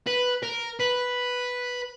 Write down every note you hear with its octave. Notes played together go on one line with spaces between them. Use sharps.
B4
A#4
B4